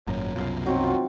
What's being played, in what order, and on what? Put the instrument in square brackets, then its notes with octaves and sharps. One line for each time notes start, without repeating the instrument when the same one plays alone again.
[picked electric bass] G#1 F#2 A#2 [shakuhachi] C#5 [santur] A#5
[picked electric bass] C2 F#2 B2 [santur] F4 F5
[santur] F#3 D#4 G5 [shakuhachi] C4
[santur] F4 F#4